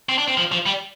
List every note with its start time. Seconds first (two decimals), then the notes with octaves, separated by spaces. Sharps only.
0.09 C4
0.18 D4
0.28 C4
0.37 F3
0.52 F3
0.66 G3